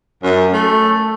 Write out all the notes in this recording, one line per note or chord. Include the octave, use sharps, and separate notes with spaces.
F#2
A3